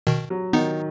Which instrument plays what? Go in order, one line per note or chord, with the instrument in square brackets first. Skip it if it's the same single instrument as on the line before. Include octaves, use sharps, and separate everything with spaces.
[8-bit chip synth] B2 D#3
[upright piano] F#3
[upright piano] D#3 [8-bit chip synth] B3 D#4